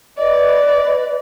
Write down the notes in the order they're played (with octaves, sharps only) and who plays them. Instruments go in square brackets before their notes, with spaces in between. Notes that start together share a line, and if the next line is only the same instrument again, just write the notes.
[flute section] B4 D#5 [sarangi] D5